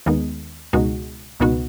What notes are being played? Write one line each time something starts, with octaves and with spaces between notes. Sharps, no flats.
D#2 D#3 G#3 B3 D#4
C#2 B2 G#3 D#4 F#4
C#2 B2 B3 D#4 F#4